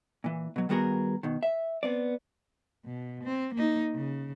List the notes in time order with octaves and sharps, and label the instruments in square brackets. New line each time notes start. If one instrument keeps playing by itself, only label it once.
[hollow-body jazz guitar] A#2 E3
B2 F#3
D#3 G3 B3 F#4 G#4 A#4
B2 D#3
E5
B3 C4 D5
[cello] B2
C4
A#3 D#4
C#3